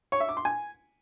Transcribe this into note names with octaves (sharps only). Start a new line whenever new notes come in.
C#5
E5
D6
C6
G#5